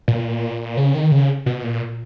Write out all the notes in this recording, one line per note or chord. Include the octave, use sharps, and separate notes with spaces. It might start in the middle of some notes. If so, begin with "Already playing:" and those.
A#2
C#3
D#3
C#3
B2
A#2